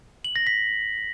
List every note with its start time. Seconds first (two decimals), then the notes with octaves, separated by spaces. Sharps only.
0.25 F#7
0.36 A#6
0.47 B6